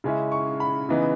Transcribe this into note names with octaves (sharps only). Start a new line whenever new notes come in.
C#3 G#3 C#4 E4
C#6
B5
C#3 E3 B3 D#4